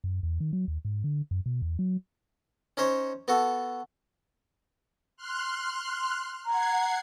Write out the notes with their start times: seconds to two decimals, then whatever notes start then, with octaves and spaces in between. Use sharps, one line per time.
0.04 F#2
0.23 E2
0.40 D#3
0.53 F#3
0.68 D#2
0.85 G#2
1.04 D3
1.31 F#2
1.46 B2
1.62 E2
1.79 F#3
2.77 C#4 D#4 C5 C#5
3.28 B3 F#4 A4
5.16 C6 F6 F#6
6.45 F#5 A#5 G#6 C7